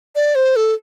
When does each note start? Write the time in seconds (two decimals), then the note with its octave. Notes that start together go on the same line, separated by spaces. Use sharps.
0.15 D5
0.35 C5
0.56 A4